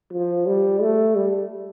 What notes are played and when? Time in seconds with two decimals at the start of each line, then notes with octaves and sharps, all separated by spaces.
0.13 F3
0.47 G3
0.81 A3
1.15 G3